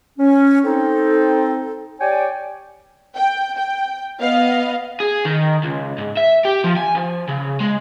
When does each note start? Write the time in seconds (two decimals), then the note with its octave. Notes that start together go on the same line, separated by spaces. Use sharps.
0.19 C#4
0.64 C4 D#4 A4
2.00 G4 C#5 D5 G5 G#5
3.16 G5
3.57 G5
4.21 B3 D#5 F5
5.00 G#4
5.25 D#3
5.63 C#2
5.98 G#2
6.17 E5
6.45 G4
6.64 F3
6.77 G#5
6.95 F3
7.29 C#3
7.60 G#3